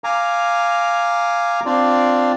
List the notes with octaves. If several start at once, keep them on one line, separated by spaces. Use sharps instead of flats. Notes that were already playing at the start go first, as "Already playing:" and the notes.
F5 G#5 A#5 D6
C4 D4 F4 D5